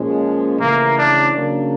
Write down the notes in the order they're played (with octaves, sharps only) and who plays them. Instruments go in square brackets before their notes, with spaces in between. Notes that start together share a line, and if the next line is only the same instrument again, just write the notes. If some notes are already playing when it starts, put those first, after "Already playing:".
Already playing: [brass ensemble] A#2 F3 G#3 C#4
[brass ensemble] C#3 E3 A3 C#4 [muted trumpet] A#3
[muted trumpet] D4
[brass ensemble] C#3 F#3 A#3 D4